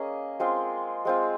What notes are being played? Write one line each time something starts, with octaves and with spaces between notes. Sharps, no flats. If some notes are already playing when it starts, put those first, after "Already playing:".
Already playing: A#3 C#4 G#4 D#5
G#3 C4 F4 G#4
G#3 C4 F4